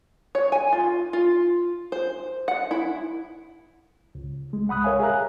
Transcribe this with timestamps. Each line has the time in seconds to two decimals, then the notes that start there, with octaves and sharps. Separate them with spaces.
0.35 C#5
0.52 G#5
0.73 F4
1.13 F4
1.92 C5
2.48 F#5
2.71 E4
4.15 C#2
4.53 G#3
4.68 C2 F#5 B5 D#6 F#6
4.84 A#4 C#5 E5 F5 G#5
5.00 G#4 E5 F5 A#5 F#6